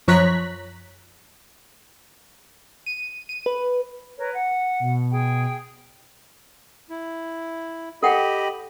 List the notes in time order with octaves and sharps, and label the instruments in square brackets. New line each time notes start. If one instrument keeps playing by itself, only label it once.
[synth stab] F#2 F3 C#5 A#5 F#6 B6
[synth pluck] D#7
D#7
B4
[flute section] A#4 B4 C#5
F#5
[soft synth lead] B2
[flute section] G#4 G5
[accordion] E4
[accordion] G4 D#5 B5 [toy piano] A4 F#5 G5